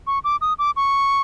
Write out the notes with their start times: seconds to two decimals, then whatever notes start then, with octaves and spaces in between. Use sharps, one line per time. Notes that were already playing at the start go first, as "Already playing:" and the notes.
0.07 C#6
0.24 D6
0.41 D#6
0.59 D6
0.76 C#6